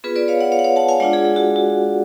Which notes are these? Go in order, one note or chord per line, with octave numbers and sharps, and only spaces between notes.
B3 F4 G#4 B4
B4 D5
C#5 F5
D5 F#5
C#5 F5
F#5
C#5 F5
F#5 A5
F5 G#5
G#3 D4 F4 D5 F#5
G#4
G#4
F#4
F#4